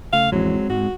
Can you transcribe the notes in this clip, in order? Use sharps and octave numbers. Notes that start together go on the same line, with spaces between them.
C#3 A3 F5
A1 F2 E3 F#3 G#3 C4
G#2 F#4